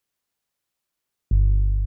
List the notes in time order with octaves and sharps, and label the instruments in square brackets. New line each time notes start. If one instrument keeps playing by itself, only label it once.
[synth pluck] G1